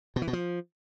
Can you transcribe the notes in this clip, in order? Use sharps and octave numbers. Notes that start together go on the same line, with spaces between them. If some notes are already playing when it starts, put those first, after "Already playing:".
B2
E3
B2
F3